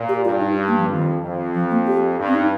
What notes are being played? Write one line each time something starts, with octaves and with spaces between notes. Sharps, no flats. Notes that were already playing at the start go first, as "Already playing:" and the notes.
Already playing: A#2
G4
G2 F4
D#4
A#3
F3
F2 D#3
F2
F3
A#3
G4
G2
C4
D#4